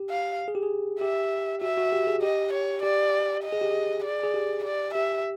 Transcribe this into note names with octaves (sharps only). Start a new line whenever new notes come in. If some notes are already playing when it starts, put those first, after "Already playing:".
Already playing: G4
F5
G#4
G4
G#4
G4 E5
F#4 E5
F#4
G4
G#4
G4 D#5
C#5
G4 D5
D#5
G#4
G4
G#4
D5
G#4
G4
D5
G4 E5